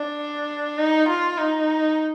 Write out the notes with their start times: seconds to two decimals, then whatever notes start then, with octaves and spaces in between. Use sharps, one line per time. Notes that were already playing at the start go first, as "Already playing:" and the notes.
Already playing: D4
0.77 D#4
1.08 F4
1.38 D#4